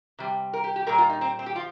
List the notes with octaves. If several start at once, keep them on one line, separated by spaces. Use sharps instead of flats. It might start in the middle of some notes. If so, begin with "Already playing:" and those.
C3 G3
A#4
G4
G4
A#2 G3 A#4
F4
D#4
C4
C4
G4
F3 F4